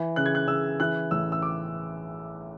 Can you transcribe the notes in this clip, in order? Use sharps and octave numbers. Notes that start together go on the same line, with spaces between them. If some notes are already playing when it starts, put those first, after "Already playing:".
Already playing: E3
C#3 F#6
G#6
F#6
C#3 E6
E3 F#6
A1 E6
E6
D6